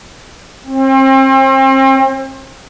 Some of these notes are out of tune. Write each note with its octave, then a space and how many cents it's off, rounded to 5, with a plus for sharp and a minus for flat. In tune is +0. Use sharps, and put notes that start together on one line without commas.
C4 +35